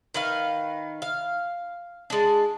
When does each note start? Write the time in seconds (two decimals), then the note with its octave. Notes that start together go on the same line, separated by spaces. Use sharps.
0.14 D#3 B4 F5
1.02 F5
2.10 G#3 D4